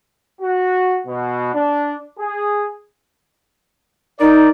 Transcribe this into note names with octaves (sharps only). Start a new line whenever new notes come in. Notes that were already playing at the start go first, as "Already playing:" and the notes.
F#4
B2
D4
G#4
D#4 A#4 D5